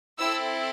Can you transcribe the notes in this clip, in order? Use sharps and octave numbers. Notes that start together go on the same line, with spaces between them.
C4 E4 A4 E6